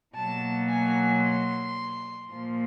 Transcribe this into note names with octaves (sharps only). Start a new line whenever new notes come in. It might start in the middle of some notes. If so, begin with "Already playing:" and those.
B2 F#3 A#3 A5
G#5
C6
A#2 F3 A#3